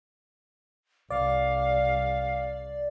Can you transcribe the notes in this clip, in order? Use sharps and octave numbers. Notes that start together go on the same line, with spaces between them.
C2 D5 F5